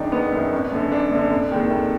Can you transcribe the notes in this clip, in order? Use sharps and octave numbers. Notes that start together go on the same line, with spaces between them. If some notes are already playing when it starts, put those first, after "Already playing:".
Already playing: F#1 F#2 D#3 D4 D#4
F#1 B3
F#2 D#3
G#1
F#2 D3
G#1 D4
F#2 D3
F1
D#2 D#3 G#3
F1